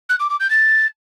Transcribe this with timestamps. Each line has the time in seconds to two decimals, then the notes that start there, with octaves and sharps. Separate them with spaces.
0.09 F#6
0.19 D6
0.29 D6
0.40 G6
0.50 A6